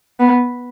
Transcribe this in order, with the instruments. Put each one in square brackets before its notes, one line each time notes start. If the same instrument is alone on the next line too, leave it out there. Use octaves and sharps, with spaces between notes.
[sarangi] B3